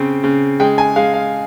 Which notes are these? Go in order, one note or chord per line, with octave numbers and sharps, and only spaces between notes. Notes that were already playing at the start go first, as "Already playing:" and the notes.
Already playing: C#3 C4
C#3
G#3 G5
G#5
G#3 F5
F5